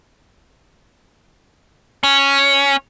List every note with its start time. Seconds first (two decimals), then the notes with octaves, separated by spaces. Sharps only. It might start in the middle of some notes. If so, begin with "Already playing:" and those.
2.04 C#4